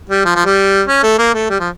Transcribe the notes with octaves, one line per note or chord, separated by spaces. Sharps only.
G3
F3
F3
G3
C#4
A3
A#3
A3
G3
F3